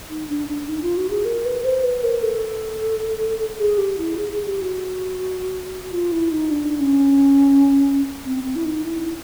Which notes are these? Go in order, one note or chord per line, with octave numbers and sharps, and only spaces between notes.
D#4
D4
D4
D#4
F4
F#4
G#4
A#4
B4
C5
B4
A#4
A4
G#4
G4
E4
G#4
G#4
G4
F#4
F4
E4
D#4
D4
C#4
C4
C4
E4
D#4
E4